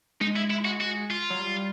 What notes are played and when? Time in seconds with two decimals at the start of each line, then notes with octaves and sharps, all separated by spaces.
0.21 G#3 D#4
0.36 E4
0.51 E4
0.65 F#4
0.81 F#4
1.10 F4
1.30 F#3
1.40 G3